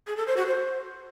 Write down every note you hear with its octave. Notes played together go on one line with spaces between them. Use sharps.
G#4
A4
C5
F#4
C5